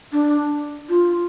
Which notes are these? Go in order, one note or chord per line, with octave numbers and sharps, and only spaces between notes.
D4
F4